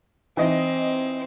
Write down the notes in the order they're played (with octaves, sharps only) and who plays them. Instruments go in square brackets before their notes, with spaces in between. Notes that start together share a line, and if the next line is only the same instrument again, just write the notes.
[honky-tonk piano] E3 D#4 D#5 [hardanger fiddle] C4